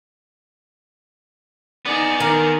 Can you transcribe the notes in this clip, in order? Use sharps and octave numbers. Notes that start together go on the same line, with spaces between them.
B3 D#4 G#4 D5
D#3 A#4